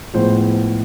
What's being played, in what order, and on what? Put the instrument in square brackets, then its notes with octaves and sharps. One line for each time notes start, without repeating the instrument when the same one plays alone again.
[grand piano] A2 F3 G#3 B3 C5